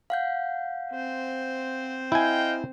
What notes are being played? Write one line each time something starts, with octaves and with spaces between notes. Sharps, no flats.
F5 F#5 G6
C4 C5
E4 D#5 F5 G5 G#5